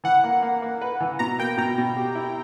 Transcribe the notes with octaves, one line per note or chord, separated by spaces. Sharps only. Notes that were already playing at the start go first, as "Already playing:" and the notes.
E3 F#5
A#3
A#3
A#3
B4
E3
B2 A#5
A#3 G5
B2 A#5
B2
G4
E4